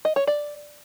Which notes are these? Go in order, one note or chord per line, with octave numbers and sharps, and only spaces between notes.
D#5
C#5
D5